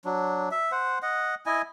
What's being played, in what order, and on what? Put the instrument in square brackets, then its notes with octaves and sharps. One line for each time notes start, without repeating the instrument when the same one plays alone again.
[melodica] F#3 D4
E5
C5 F#5
D#5 F#5
E4 D#5 G#5